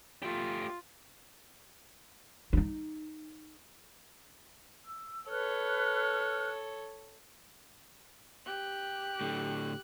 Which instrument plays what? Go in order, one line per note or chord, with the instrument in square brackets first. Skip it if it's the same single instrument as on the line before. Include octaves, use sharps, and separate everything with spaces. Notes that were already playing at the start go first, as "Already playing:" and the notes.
[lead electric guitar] A3 G4 [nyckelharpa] F4
[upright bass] D#4 E4
[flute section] E6
[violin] A4 C#5 [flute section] B4 F6 F#6
[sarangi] G4 [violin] F#6
[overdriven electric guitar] A2 D3